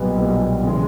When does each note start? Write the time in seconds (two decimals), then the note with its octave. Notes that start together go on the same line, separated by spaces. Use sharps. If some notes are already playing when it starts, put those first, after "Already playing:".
Already playing: B1 A#2 G3 B3
0.18 B1 A#2 G3 B3
0.63 C#3 E3 G#3